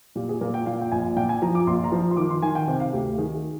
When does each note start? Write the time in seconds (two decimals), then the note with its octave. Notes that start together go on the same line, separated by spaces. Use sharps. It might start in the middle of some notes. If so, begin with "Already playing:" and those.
0.15 A#2 G4
0.29 G#4
0.41 A#2 A#4
0.54 G5
0.66 A#2 F5
0.81 G5
0.92 A#1 G#5
1.16 A#2 G5
1.29 G#5
1.42 F3 A#5
1.55 D6
1.67 A#1 C6
1.84 A#5
1.92 F3
2.11 C6
2.17 D#3 D6
2.30 C6
2.42 D#3 G#5
2.55 G5
2.67 C3 G5
2.80 F5
2.93 D2 G4
3.05 G4
3.18 D#3 G#4
3.35 G#4